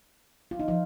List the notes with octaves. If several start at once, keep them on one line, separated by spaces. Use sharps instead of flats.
F4
D#4
F3 F4